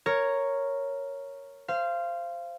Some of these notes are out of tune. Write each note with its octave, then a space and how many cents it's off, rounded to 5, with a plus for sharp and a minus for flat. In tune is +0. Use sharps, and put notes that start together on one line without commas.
A#4 -5 C#5 +0
C5 +0 F5 -20